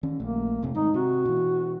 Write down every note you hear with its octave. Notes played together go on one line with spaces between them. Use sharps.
D#3 C#4
A#1 A3 A#3
F1 C3 A3
G#2 D#3 D#4
C3 F#4
B2 E3